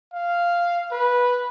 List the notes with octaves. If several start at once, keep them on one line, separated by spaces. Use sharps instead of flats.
F5
B4